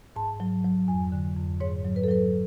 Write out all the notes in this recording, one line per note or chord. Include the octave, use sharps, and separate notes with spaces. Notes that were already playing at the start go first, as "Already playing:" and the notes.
G#2 A5
F#3
F#3
F2 G#5
D3
F2
G#2 C#5
F#3
B4
A4
F#3 B4